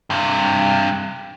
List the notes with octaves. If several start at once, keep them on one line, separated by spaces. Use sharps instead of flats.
G2 C3